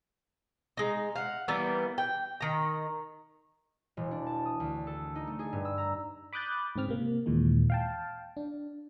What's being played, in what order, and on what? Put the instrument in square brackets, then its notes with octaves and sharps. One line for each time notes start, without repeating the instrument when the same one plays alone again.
[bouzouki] G#3 D#4
F5 F#5
E3 G3 A#3 B3
G5
D#3 A#5
[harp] E1
D4
A5
D#6
D2
A4
D#4
A3
G#4
G2
E6
A#5
[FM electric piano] B5 D6 D#6 F#6 G6 A6
G#2 C#3 C4 F6
C3 A#3
D#2 A#2 E3 G#3
F5 G5 A5
D4